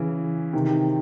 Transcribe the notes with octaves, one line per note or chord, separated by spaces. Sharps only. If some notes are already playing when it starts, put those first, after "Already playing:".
Already playing: C#3 E3
C3 D#3